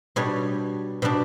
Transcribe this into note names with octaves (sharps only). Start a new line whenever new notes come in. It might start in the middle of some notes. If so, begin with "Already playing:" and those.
B2 G3 D4 C#5
B2 G3 D4